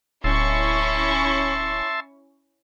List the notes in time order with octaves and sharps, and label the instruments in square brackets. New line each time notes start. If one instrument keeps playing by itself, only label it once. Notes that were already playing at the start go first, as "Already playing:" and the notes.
[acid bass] D1 [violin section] C#4 E4 C#6 [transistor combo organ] E5 A5 C6